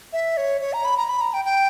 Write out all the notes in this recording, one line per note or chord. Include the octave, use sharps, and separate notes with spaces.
E5
C#5
C#5
A#5
B5
A#5
B5
A#5
G5
G5